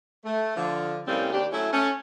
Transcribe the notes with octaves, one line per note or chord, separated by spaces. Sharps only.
A3
D3 F3
A2 C3 G3 A#3 C4 C#4
D#2 D4 G4
F#3 A3 C#4 E4
A3 C#4